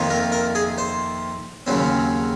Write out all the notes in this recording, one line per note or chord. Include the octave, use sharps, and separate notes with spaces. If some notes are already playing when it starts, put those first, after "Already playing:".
Already playing: F2 C3 D#3 A#3 F4
A#4
A#4
G#4
C5
D#2 C#3 F#3 C4